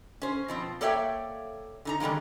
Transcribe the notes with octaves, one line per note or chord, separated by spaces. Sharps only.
C#4 C5
B2 F3 C4
A#3 A4 C#5 D5 E5 G5
D3 D#4 A#5
D3 D#3 G3 G#3 A#3